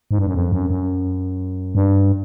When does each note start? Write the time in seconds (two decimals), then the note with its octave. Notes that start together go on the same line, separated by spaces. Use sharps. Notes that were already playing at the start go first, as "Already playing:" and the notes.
0.11 G#2
0.18 G2
0.27 F#2
0.34 F2
0.52 F#2
0.70 F#2
1.75 G2